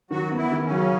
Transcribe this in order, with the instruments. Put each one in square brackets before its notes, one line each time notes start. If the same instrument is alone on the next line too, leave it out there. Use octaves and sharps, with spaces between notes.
[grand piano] D#3 [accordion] F#3 F#4
[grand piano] B3
[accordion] E3 E4
[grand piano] D#3
[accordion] C#3 C#4
[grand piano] F#3